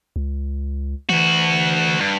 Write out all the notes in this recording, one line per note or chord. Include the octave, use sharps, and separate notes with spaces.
C#2
D2 E3 F#4
G2